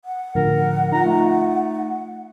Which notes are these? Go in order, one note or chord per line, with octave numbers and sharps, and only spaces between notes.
F#5
A2 D3 F3 A#4
D#4 F4 A#5
A3